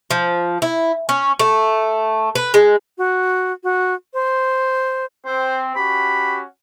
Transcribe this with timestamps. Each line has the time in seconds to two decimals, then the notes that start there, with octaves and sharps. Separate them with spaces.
0.11 F3
0.62 E4
1.09 C#4
1.39 A3
2.35 B4
2.54 G#3
2.98 F#4
3.64 F#4
4.14 C5
5.26 C4 C5
5.76 C#4 F#4 G4 B5